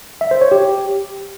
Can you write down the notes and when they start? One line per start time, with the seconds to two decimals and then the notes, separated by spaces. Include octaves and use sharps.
0.21 E5
0.31 C5
0.41 C#5
0.52 G4